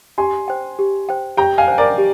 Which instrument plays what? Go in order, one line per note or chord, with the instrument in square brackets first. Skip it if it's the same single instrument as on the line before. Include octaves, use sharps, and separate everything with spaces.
[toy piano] G4 [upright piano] G#5 C6
[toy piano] C5 G5
G4
C5 G5
[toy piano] G4 [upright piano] G5 A#5
[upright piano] F5 G#5
[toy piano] C5 G5
[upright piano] A#4 D5
[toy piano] G4